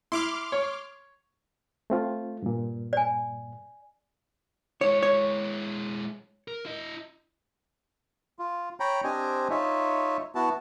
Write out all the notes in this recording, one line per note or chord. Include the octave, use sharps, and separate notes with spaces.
E4 C6 D6 F6
C#5
A3 C4 F4
G2 A#2
D5 G#5
G#3 E4 C#5
C#5
A#4
E4 D#5
F4
C#5 G5 A#5 B5
C4 D4 G4 C5 D#5 G#5
D#4 F4 C#5 E5
B3 E4 F#4 A5